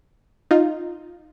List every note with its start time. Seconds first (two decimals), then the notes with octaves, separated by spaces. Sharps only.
0.51 D#4 F4